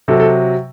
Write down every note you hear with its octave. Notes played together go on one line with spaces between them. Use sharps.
C3 F#3 A4
A4